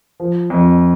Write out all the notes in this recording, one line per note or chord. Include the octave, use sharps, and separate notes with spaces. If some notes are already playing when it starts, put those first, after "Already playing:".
F3
F2